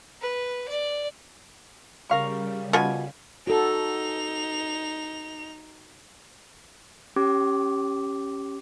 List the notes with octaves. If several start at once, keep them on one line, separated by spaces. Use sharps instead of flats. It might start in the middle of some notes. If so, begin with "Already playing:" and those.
B4
D5
C#3 G3 A#4 F5 C#6
B2 F4 G#5
D#4 F#4 A4 F7
C#4 G4 D6